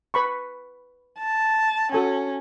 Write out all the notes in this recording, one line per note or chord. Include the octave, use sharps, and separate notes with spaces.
B4 B5 C#6
A5
C#4 F#4 A4 G#5